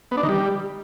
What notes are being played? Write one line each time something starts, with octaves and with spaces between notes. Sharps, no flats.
B3
D4
D#3
G3